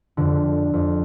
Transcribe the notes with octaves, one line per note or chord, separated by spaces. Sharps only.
F2 D3
F2